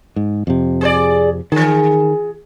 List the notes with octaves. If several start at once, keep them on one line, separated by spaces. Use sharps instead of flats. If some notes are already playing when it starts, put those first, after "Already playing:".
G#2
F2 C3
G#4 C5 D5
D#3 E3 G#4